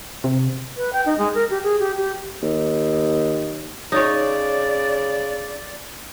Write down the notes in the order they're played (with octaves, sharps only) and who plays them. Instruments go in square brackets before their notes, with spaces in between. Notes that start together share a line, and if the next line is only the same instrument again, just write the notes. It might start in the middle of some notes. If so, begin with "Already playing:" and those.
[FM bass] C3
[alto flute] B4
G5
D#4
G#3
A#4
G4
G#4
G4
G4
[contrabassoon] D#2
[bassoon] C#3 [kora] D#4 C#5 [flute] D5